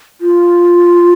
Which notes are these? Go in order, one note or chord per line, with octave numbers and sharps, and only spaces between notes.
F4